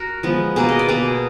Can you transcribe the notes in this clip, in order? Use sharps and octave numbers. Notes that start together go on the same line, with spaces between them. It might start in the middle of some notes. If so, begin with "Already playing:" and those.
Already playing: F#4 A#4
F3 G#3 B3
B2 A#3 G#4 B4
D#5
D5
B2 A#3 G#4 B4